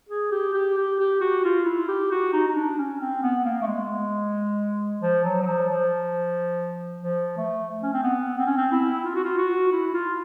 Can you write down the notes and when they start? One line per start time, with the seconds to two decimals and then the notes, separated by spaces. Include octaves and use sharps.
0.09 G#4
0.31 G4
0.54 G4
0.77 G4
0.99 G4
1.21 F#4
1.44 F4
1.66 E4
1.88 G4
2.11 F#4
2.33 D#4
2.48 D#4
2.55 D4
2.78 C#4
3.00 C4
3.23 B3
3.45 A#3
3.62 A3
3.67 G#3
5.02 F3
5.24 F#3
5.41 F#3
5.46 F3
5.69 F3
7.03 F3
7.37 A3
7.82 C#4
7.93 C4
8.03 B3
8.38 C4
8.46 C#4
8.57 C4
8.72 E4
9.05 F4
9.15 F#4
9.24 F4
9.38 F#4
9.72 E4
9.94 F4